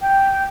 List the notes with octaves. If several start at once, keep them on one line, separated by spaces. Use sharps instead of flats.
G5